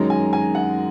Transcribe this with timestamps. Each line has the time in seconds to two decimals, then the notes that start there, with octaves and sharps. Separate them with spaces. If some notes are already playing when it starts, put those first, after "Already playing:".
Already playing: F#2 D#3 G#3 C#4 A#5
0.10 G#5
0.33 G#5
0.55 F#5